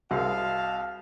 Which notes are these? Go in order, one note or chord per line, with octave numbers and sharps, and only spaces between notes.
C2 C3 F#4 G#4 A#4 D#5 F5 A5